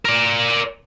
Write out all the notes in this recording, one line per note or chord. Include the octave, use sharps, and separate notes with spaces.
A#4 D5